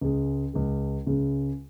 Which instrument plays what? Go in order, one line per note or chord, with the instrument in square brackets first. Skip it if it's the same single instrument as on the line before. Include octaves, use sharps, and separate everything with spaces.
[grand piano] C#2 C#3 G#3
C#2 C#3 G#3
C#2 C#3 G#3